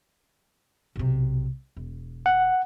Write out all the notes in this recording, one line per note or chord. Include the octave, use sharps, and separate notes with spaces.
B1 C3
E1
F#5